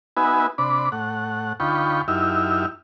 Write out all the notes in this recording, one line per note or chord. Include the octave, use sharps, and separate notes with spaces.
B3 D#4 F#4 B4 E5 G#5
C3 D4 D5 B5
A2 F#5
D2 D#4 F4 G5 B5 C#6
F#2 D#4 E4 G4 E5 F6